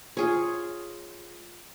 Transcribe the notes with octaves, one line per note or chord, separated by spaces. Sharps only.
F4 G#4 C#5